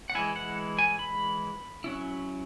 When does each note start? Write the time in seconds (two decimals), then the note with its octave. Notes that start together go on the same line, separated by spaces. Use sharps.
0.10 F#5
0.15 E3 G#3 E4 G#5
0.36 F#5
0.79 G#5
0.99 B5
1.84 F#3 C#4 E4